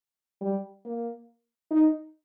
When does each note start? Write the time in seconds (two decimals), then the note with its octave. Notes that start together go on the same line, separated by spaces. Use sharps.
0.41 G3
0.85 A#3
1.71 D#4